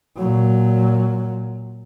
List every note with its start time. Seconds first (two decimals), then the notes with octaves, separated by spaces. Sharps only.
0.17 A#2 F#3